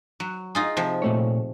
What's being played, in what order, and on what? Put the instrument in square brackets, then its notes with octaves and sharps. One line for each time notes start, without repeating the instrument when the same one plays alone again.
[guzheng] F#3
D#4 F4 G#4
C3 F3
[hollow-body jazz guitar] A#2 A3 C#5